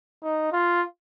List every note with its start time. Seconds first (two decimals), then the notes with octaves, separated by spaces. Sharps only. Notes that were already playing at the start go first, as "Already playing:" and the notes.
0.23 D#4
0.52 F4